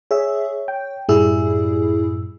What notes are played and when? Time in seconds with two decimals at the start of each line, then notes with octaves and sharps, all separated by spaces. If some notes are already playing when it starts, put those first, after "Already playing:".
0.11 G#4 C#5 E5
0.68 G5
1.09 F#2 A2 G3 E4 G#4 E6